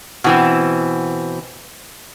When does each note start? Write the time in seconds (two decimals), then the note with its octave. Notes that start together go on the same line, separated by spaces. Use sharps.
0.24 B2 E3 C4